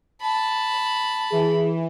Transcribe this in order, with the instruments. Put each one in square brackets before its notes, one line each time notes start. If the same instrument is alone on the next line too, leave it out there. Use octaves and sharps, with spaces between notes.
[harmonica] A5 [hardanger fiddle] B5
[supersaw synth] E3 [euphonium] G#4